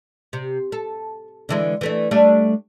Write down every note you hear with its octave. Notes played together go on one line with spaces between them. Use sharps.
C3
A4
D3 E3 G#3
E3 A3 D4
G3 A3 D4